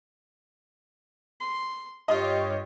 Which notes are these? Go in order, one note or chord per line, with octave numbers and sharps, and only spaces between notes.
C6
G2 F4 G4 C#5 D#5